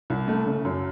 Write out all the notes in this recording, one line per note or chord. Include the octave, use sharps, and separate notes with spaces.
C2
A3
C#3
F#2